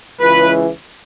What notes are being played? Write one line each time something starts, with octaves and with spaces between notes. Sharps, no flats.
C#2 C#3 E3 B4